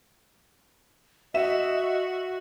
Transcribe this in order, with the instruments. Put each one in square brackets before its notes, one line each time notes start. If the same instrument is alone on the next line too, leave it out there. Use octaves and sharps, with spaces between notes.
[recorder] F#4 [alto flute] D#5 [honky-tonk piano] E5 E7